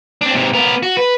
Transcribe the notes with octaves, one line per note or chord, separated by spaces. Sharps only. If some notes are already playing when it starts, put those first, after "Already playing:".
C4 D4
G#2 C3
B3 A#4
F#4
B4